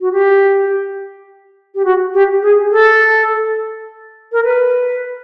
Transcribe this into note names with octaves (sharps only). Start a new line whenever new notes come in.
F#4
G4
G4
F#4
G4
G#4
A4
A#4
B4